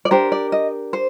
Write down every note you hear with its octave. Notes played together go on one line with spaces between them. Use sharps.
D5
D4 G4 A#4 C5
D5
D#5
C5